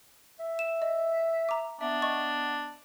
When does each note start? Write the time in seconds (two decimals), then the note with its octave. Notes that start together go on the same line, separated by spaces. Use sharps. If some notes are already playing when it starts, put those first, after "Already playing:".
0.39 E5
0.59 E7
0.82 D#5
1.49 A#5 D6
1.81 B3 D4 E5
2.02 D#5 C#6 A6